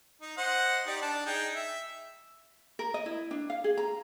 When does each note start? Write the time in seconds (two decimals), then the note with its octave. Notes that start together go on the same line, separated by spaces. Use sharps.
0.22 D#4
0.37 C5 D#5 F#5
0.87 D#4 G4 D5
1.02 D4 A5
1.26 D#4 G#4 G5
1.55 E5
2.79 A#4
2.94 D#5
3.06 E4
3.31 D4
3.50 F5
3.64 G#4
3.77 A#5